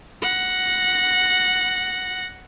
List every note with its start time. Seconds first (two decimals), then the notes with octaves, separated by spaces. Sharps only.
0.22 F#5 A#6